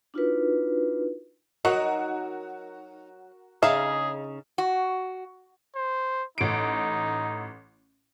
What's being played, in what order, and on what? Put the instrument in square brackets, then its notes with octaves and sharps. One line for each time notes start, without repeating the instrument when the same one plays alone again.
[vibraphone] D4 D#4 F4 F#4 A#4 B4
[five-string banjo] F#3 [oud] D#4 [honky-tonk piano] F#4 A#4 F#5
[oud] C#3 D#4 [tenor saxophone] G#4 [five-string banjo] E5 F5
[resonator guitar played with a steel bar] F#4
[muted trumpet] C5
[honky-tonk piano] A1 D7 [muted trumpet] D#4